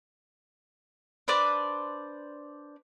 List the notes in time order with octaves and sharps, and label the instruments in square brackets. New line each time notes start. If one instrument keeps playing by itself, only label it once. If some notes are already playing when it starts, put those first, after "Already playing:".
[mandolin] D4 B4 C5 D5